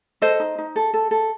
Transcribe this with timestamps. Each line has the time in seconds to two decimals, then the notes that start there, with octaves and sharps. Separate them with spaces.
0.22 A4 C5 D#5
0.40 D#4
0.58 D#4
0.76 A4
0.94 A4
1.11 A4